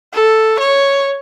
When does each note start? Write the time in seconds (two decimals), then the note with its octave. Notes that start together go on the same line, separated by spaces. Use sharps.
0.13 A4
0.60 C#5